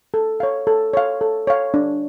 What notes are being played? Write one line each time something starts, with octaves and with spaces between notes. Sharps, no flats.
A4
C#5 F5
A4
C#5 F5
A4
C#5 F5
D4